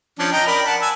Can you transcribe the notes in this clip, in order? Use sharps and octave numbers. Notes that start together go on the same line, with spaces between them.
F3 C#4 D4
D#5 G5 A#5
A#4 D5 B5
F#5 A5
G#5 E6